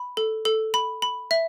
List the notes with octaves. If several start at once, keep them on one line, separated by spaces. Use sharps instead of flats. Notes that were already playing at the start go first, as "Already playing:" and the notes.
Already playing: B5
A4
A4
B5
B5
E5